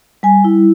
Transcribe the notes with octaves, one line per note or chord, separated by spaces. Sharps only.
G3 G#5
E4